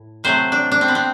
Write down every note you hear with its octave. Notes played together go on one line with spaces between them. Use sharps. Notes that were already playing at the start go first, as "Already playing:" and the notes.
Already playing: A2
C3 F#3 A3 C5
D4
D4
C4
B3
C4